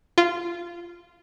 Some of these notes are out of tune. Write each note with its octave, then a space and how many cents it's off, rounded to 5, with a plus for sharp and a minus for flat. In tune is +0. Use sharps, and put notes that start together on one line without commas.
F4 -15